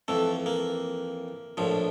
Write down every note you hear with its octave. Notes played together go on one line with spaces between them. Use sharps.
F2 E3 A3
A#3
A#1 A2 F3